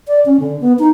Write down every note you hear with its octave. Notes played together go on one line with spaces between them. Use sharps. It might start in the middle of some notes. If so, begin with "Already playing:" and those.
D5
C#4
D3
B3
D#4